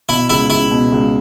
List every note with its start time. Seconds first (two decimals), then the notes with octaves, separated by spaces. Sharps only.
0.09 B2 E4
0.30 C#2 E4
0.50 C#2 E4
0.71 B2
0.92 C#2